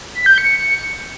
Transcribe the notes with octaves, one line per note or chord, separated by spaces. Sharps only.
B6
G6
C#7